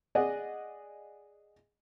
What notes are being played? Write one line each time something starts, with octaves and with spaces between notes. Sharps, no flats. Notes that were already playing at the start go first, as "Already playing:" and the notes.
G#4 D5 D#5 F#5